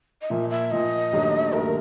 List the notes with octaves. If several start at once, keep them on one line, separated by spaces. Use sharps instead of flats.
D#5
A#2 F3 A#3 E5
E5
A#2 F3 A#3 D#5
D#2 D#3 F#3 A3 D4
D#2 D#3 F#3 A3 D4 A#4